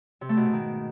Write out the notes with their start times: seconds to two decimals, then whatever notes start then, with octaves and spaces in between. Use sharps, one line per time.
0.21 C3
0.29 A3
0.37 B2
0.45 G#2
0.53 D#3